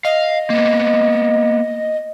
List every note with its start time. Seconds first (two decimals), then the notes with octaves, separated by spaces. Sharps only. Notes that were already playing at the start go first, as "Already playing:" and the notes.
0.05 D#5 F5
0.50 A#3 B3